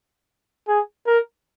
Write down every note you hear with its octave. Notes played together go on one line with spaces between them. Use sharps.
G#4
A#4